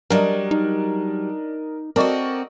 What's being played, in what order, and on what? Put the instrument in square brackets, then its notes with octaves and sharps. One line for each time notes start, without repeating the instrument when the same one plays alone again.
[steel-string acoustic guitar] F#3 G3 [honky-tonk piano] D4 [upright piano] A#4 D5 D#5
[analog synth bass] D#4
[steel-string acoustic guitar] C4 F#4 [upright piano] A4 D#5 [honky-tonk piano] A#4 D5 C#6